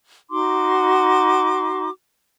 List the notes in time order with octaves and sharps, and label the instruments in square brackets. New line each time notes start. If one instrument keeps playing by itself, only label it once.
[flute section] D#4 F#4 C6 D6